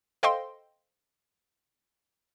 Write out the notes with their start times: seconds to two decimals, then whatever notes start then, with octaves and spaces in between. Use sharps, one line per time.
0.23 A4 C5 D#5 F5 G5 C6